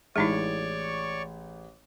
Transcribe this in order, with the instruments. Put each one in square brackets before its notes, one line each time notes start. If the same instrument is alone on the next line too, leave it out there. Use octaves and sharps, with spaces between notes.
[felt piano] A1 G#4 [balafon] G#3 D#4 E4 [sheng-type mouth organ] C#5 D5 C#6